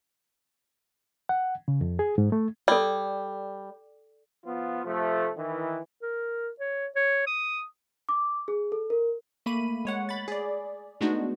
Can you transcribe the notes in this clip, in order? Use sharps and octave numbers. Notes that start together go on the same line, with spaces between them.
F#5
C#3
F2
G#4
G#2
A3
G3 A4 D5
F3 B3 F4
C3 F3 A3
D#3 E3
A#4
C#5
C#5
D#6
D6
G#4
A4
A#4
A3 A#3 B5 D#7
G#3 C#5 F#5
B5 A6
G#4 D5
G#3 A3 B3 D4 D#4 F#4